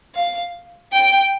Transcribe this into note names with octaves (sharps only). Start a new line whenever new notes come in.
F5
G5